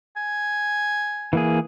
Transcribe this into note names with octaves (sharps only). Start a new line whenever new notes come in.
G#5
E3 A#3 G#4